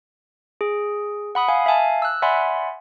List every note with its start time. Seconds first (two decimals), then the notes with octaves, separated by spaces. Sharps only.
0.61 G#4
1.35 F#5 B5 D#6
1.48 F5 G#5
1.66 E5 F5 G#5 A5
2.02 E6 F#6
2.22 D5 E5 F#5 G#5 B5 C6